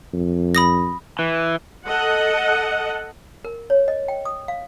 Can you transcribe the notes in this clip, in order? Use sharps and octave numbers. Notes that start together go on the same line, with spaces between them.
F2
B5 D#6 A#6
E3
A4 D#5 F#5
A#4
C#5
D#5
G5
D#6
F5